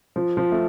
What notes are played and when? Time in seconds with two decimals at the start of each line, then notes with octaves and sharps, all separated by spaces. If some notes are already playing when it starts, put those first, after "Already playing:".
0.16 F3
0.37 F3
0.52 A3